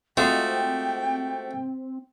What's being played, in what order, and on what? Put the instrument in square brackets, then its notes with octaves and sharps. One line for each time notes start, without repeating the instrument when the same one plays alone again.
[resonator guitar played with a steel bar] G#3 F4 F#4 [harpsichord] A3 [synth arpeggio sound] C4 [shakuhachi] G5